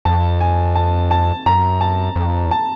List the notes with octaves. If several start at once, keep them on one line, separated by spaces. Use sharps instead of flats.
F2 A5
G#5
A5
A5
F#2 A#5
A5
F2
E2
A5